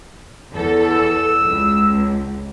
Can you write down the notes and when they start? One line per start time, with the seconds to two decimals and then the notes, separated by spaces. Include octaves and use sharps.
0.53 E2 A4
0.91 E6
1.43 C#2